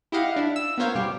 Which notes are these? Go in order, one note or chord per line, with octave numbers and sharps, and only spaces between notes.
E4 G4 D#5 F5 F#5
D4 E4
E6
B3 F4 A#4 C5 C#5 F5
B2 G3 G4